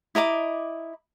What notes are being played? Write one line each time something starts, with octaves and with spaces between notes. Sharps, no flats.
E4 D#5 A#5 D6